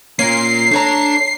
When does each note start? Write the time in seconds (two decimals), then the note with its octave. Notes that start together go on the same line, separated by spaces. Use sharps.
0.19 A#2 A#3 C#4 A#4 C7
0.71 A3 D4 C#5 A5 A#5